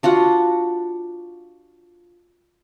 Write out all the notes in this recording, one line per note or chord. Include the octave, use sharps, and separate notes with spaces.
D4 F4 F#4 F#5